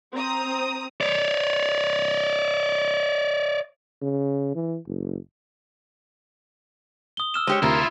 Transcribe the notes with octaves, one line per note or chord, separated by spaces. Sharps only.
C4 A#5 D#6
C#5 D5
C#3
E3
F#1
D#6 G7
E6 F6 E7
G#3 G4 C5 C#5
D2 C3 E4 F4 A#4